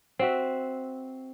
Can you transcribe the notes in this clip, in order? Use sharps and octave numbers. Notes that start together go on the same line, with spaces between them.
C4 F#4 E5